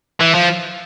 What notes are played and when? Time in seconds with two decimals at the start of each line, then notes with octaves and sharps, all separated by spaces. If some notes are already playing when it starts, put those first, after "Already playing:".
0.21 E3
0.35 F3